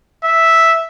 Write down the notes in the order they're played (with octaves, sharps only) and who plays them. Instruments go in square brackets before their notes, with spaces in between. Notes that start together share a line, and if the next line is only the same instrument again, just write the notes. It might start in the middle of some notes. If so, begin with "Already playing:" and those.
[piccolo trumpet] E5